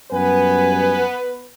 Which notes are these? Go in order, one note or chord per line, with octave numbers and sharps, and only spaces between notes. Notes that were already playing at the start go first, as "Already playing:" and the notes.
F#2 G3 B3 B4 G#5